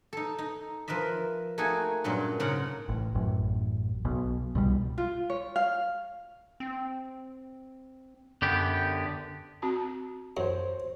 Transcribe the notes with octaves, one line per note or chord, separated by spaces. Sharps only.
D#4 A4
D#4
F3 A#4 B4 D#5 E5
A3 A#3 D#4 F#4 G#4 G#5
G2 A#2 F#3 C#4 D5
G#2 C#3 A#4 F#5 A#5
A1
A1 F#2
B1 B2
C2 B2 G3
F4
C#5
F5
C4
F#2 D3 B3 G4
C4 F#4 A5
F#2 C5 C#5